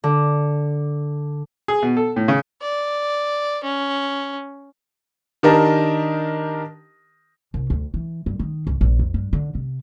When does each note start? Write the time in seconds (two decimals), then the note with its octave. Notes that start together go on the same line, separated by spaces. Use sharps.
0.04 D3
1.68 G#4
1.83 B2
1.97 A4
2.16 A2
2.28 C#3
2.62 D5
3.63 C#4
5.43 D#3 D4 G4 A#4 D#5 A5
7.54 C2
7.70 D2
7.94 E3
8.26 G2
8.39 D#3
8.67 C#2
8.81 A#1
8.99 F2
9.14 G2
9.33 D3
9.55 C3